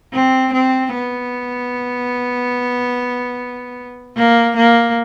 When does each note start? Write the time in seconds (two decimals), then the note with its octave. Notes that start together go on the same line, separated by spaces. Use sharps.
0.13 C4
0.53 C4
0.94 B3
4.16 A#3
4.57 A#3